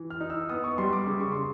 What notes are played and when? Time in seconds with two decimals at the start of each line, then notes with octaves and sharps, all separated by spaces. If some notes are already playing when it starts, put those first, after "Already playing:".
Already playing: E3
0.10 F6
0.20 D#4
0.30 E6
0.49 B3 D#6
0.64 C#6
0.78 G3 C6
0.93 D6
1.07 C#3 D6
1.20 C#6
1.32 C#3 C6